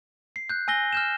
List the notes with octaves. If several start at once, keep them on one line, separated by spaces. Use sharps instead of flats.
C7
F#6 G6
G#5 E6 A#6 G7
F6 G6 E7